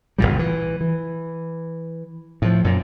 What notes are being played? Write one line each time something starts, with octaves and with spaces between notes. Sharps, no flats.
F#1 C2 A#2 G3
E3
E3
A2 F3
F#2 A#2